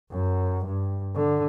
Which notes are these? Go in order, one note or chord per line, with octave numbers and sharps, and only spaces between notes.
F#2
G2
D3